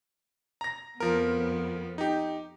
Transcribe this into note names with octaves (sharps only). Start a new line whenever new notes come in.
A#5 A#6
F2 F3 B3 A#4
D#4 G4